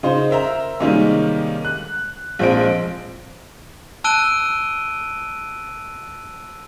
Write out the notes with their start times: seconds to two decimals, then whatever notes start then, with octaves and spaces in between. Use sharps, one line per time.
0.03 C#3 D#4 F4 C5
0.30 A#4 C5 E5 A#5
0.80 C3 D#3 G3 G#3 A#3 C#4
1.65 F#6
2.39 A#1 F3 G#3 C4 D7
4.04 A5 E6 F#6 D7 D#7 G7